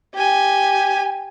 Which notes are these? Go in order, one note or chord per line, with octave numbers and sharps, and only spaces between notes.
G4 G#5